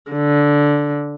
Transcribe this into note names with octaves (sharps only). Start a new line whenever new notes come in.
D3